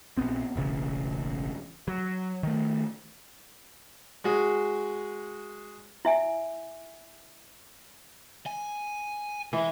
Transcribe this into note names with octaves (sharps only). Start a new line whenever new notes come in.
A#1 B3 C4
E1 A1 C#3
F#3
D#3 A3
G#3 F#4 G#4
E4 E5 G#5
G#5
E3 G#3